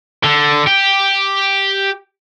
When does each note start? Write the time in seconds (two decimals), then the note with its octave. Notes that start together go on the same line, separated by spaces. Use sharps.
0.24 D3
0.67 G4